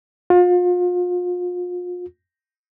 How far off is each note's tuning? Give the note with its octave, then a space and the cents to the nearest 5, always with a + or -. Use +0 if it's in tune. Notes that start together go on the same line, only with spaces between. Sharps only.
F4 +35